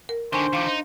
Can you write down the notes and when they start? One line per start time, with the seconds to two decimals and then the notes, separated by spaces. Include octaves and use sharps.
0.09 A#4
0.33 D3 D#3 D4 C5 G#5 C#6
0.53 D#3 F3 F5 D6
0.66 D#4